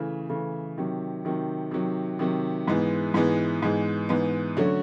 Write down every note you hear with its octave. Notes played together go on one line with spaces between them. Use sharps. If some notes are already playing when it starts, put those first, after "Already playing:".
Already playing: C#3 E3 A3
C#3 E3 A3
C3 D#3 F#3
C3 D#3 F#3
C3 D#3 F#3
C3 D#3 F#3
G#2 E3 G#3 B3
G#2 E3 G#3 B3
G#2 E3 G#3 B3
G#2 E3 G#3 B3
D3 F#3 A3 C#4 F#4